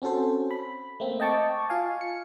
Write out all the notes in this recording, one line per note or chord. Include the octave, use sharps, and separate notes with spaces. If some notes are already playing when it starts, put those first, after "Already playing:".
C4 C#4 F#4 A4 C5
B5
A3 A#3 C4
D#5 G5 A5 C#6 D6
F4 F5 G#5
C#7